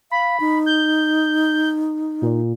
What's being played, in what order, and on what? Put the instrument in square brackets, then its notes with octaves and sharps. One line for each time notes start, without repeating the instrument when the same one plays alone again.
[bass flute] F5 [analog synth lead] B5
[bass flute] D#4
[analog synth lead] G6
A#2